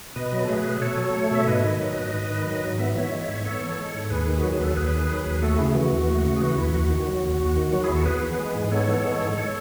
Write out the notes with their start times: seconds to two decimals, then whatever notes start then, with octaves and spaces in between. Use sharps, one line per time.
0.16 B2 B4 D#5
0.32 F#3
0.43 A4
0.48 A3 G#4 B4
0.65 B2
0.81 B2 A4 C#5
0.98 F#3
1.15 A3
1.31 B2 E5
1.47 G#2 B4 D#5
1.64 D#3
1.80 F#3
1.97 G#2
2.13 G#2
2.30 D#3
2.46 F#3
2.63 G#2
2.79 B3 E5
2.95 E3 C#5 E5
3.12 G#3
3.28 G#2
3.44 B3 A4 C#5
3.61 E3
3.78 G#3
3.94 G#2
4.10 D#2 G#4 B4
4.27 D#3
4.37 F#4
4.44 F#3
4.50 G#4
4.60 D#2 A4
4.76 D#2 G#4 B4
4.93 D#3
5.09 F#3
5.26 D#2
5.42 A3 F#4 A4
5.59 C#3 E4 G#4
5.75 E3 F#4
5.92 D#2
6.08 A3
6.25 C#3
6.36 G#4
6.41 E3 F#4
6.57 D#2 E4
6.74 D#2 F#4
6.90 D#3
7.07 F#3
7.24 D#2
7.40 D#2
7.56 D#3
7.72 F#3 F#4
7.84 E4 G#4
7.89 D#2
7.94 F#4 A4
8.05 B3 G#4 B4
8.23 E3
8.39 G#3
8.55 G#2
8.71 B3 A4 C#5
8.88 E3
9.04 G#3
9.21 G#2
9.37 A4 C#5